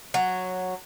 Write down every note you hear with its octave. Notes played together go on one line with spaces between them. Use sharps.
F#3